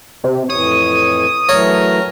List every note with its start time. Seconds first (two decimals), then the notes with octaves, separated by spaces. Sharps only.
0.24 C3
0.50 F2 A2 E3 C#5 D#6
1.49 E3 F#3 A3 A#4 C#5